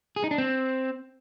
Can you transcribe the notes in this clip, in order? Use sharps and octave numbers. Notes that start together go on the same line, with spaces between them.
G#4
D#4
D4
C4